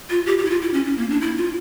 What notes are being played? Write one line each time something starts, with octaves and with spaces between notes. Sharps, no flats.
F4
G4
G4
E4
F4
E4
C#4
C#4
A#3
D4
E4
F4